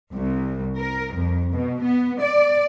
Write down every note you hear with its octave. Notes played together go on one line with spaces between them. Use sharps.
C2
A#4
F2
B2
B3
D5